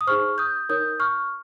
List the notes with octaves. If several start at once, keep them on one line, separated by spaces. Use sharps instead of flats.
D#6
D#4 G#4 C5 C#6 F6
D#6 G6
D#4 A#4 C#5 D#6 G6
C#6 F6